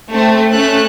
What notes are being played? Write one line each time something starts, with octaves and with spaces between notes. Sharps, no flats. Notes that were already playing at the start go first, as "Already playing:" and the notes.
A3 C4
A3 C#4 A4 F#6